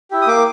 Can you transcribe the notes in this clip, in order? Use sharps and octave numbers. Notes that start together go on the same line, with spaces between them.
E4 G4
D#6
A#3 D6